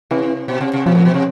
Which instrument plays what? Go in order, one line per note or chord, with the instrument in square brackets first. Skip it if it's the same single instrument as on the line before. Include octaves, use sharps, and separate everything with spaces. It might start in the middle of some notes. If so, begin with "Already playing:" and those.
[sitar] C3 [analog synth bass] E3
[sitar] B2
C3
C3
[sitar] B2 [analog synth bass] F3
[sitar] A2
B2
C3